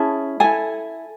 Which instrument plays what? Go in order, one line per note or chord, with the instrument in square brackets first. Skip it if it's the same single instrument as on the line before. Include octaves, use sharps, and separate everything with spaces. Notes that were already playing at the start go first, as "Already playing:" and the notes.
Already playing: [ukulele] C#4 E4 G#4 A5
E4 A4 G#5